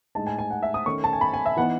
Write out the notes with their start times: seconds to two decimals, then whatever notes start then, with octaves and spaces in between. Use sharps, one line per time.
0.15 A2 G#3 D#4 A5
0.27 G#5
0.39 G#5
0.51 F#5
0.63 E5
0.74 D#6
0.86 D#3 A3 C#4 C#6
1.04 A5
1.13 G#5
1.21 B5
1.34 G#5
1.46 E5
1.57 E3 B3 D#4 F#5